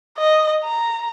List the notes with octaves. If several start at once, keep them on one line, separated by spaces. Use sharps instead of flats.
D#5
A#5